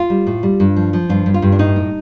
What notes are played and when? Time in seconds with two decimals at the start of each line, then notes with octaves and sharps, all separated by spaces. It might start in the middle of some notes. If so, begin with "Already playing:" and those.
Already playing: F4
0.10 G3
0.27 A2
0.43 G3
0.60 G2
0.76 F3
0.93 F3
1.09 G2 F4
1.26 G2
1.34 F4
1.42 G2
1.52 D4
1.59 A2 D#4
1.76 A2